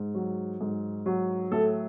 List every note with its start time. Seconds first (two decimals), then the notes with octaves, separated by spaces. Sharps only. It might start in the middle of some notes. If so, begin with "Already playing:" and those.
Already playing: G#2
0.15 F#3
0.61 G#2
1.06 F#3
1.52 A2 A4